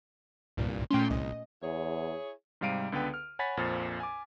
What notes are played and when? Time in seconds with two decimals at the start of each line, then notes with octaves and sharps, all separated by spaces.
0.57 C2 G2 A#2
0.91 A#2 A3 C#4 G5 C6
1.10 C2 D#5
1.62 E2 E4 G#4 C#5
2.61 G#2 C3 G3 F5 D7 D#7
2.92 C#2 D3 B3 A4 B4 G5
3.14 F6
3.39 C#5 F#5 G#5 B5 A6 B6
3.57 A#1 F2 A#2 C5 F6 A6
4.00 G#5 D6